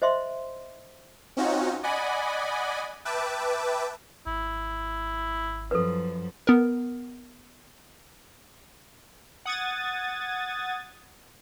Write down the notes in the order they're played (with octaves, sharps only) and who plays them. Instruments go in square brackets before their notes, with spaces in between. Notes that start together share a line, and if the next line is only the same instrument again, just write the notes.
[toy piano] C5 D#5 E5 C6
[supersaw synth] C4 C#4 D#4 F4 F#4
D5 D#5 F#5 G#5 B5
B4 E5 G5 A5 D6
[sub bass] G#1 [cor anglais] E4
[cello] F#2 F3 [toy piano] A4 B4
[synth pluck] B3 A#4
[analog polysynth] F#5 D#6 G#6 A6